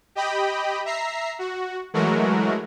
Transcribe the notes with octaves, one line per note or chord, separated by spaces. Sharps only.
G4 D#5 G5 B5
E5 A#5 C7
F#4
E3 F#3 G#3 A3 F#4 A#4